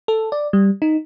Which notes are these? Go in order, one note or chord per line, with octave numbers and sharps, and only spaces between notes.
A4
D5
G3
D#4